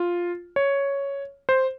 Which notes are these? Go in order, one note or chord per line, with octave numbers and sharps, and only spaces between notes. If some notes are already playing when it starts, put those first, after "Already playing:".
Already playing: F4
C#5
C5